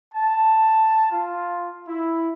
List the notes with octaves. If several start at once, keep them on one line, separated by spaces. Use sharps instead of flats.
A5
F4
E4